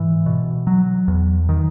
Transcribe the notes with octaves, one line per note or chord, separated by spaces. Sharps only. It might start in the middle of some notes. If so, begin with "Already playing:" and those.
Already playing: G#2 E3
B2
F#3
E2
D#3